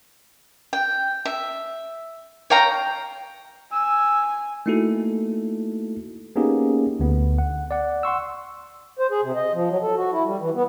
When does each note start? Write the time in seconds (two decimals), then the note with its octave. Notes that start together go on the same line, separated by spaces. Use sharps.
0.73 G5
1.25 E5
2.50 C#5 F5 G5 A#5
3.72 G#5 E6
4.66 A3 A#3 D#4 E4 F#4 A4
6.36 A#3 B3 C#4 D#4 G4 G#4
7.00 D2 D3 B3
7.38 F#5
7.71 D5 F#5
8.03 F#5 C6 C#6 E6
8.99 C5
9.11 G#4
9.23 C3
9.35 D#5
9.53 F3
9.69 F#3
9.82 A4
9.97 F#4
10.12 E4
10.25 G3
10.39 E3
10.55 B3